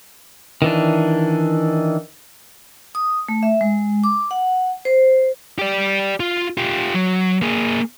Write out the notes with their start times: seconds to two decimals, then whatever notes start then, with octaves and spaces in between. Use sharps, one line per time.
0.62 D#3 E3 D4
2.95 D#6
3.29 A3
3.43 E5
3.61 G#3
4.04 D6
4.31 F#5
4.85 C5
5.59 G4 D5
6.20 F4
6.57 F4 G4
6.94 F#3
7.42 A#3 G#4